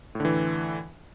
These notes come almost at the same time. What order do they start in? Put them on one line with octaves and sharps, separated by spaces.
A2 D3 E3